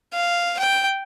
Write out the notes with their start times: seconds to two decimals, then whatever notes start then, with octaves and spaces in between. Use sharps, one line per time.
0.13 F5
0.59 G5